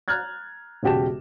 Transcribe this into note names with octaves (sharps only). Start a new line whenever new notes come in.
A#5 F6 F#6 G#6 A6
E1 C#3 F#4 G4 A5 E7